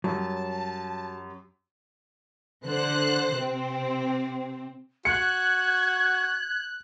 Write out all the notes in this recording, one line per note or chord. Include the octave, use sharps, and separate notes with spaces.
F#2 F#3 G3 A5
D3 C5 F#6
C3 C4
F#4 F#6 G#6 C#7